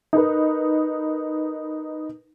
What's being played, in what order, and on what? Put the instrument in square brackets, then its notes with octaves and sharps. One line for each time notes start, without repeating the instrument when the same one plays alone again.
[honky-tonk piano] D#4 A#4 B4